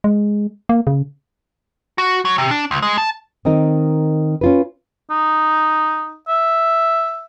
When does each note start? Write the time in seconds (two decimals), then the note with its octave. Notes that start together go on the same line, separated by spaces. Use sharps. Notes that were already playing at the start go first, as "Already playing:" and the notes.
0.04 G#3
0.69 A#3
0.87 C#3
1.98 F#4
2.25 F#3
2.38 C3
2.51 D4
2.71 C#2
2.82 G#3
2.98 A5
3.45 D#3 C4 D#4 A#4
4.41 C#4 F4 B4
5.11 D#4
6.28 E5